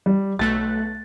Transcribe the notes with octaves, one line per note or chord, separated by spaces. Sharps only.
G3
B1 A3 F#6 A6